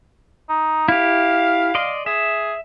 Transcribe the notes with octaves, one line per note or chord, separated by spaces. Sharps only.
D#4
E4 G4 F5
D5 D#5 C6
G#4 E5